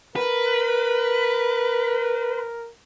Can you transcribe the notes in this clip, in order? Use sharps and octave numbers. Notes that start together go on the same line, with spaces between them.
A#4 B4